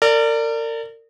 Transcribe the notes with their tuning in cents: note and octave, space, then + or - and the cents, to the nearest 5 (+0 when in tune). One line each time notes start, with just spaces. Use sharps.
A#4 -35 D5 +0